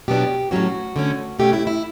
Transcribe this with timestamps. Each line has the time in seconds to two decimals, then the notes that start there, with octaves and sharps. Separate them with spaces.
0.08 B2 F#3 B3 D4 G4
0.51 A2 F#3 C#4 F#4
0.96 D3 A3 C#4
1.39 B2 A3 C#4 G4
1.53 E4
1.67 E4